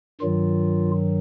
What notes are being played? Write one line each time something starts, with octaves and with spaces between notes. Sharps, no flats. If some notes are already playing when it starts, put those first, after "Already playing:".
G2 D#3 F#3 F4